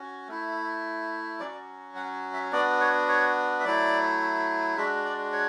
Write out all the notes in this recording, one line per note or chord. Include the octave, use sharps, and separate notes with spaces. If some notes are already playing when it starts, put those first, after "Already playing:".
Already playing: C#4 F#4
A3 E4
F#3 C#4 F#4 D5
F#5
E5
B3 D4 F#4 D5
C#5
C#5
E5
F#3 A3 E4 D5
G#3 D4 F#4 E5
D5
C#5